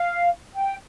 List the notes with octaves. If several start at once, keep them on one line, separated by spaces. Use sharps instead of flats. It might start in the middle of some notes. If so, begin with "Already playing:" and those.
Already playing: F5
G5